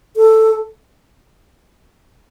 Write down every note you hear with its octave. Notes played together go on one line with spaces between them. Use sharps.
A4